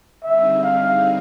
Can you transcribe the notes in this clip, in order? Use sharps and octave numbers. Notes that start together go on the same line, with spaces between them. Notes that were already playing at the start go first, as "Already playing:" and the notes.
D3 G3 C4 D#4 G#4 E5
F5